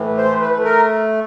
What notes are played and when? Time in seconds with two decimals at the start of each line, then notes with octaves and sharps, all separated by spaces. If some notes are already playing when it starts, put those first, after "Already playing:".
Already playing: A2 E3
0.17 C5
0.25 A3
0.41 B4
0.56 A3
0.65 A#4